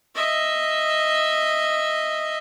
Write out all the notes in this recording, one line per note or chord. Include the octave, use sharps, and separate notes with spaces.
D#5 E5